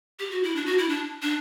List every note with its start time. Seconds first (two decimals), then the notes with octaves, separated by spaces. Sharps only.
0.19 G4
0.31 F#4
0.43 E4
0.56 D4
0.66 F#4
0.78 E4
0.89 D4
1.22 D4